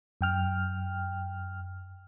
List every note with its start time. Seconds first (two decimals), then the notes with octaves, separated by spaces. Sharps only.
0.21 F#2 G5 F6